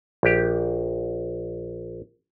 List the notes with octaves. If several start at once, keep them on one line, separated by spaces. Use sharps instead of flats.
A#1 G4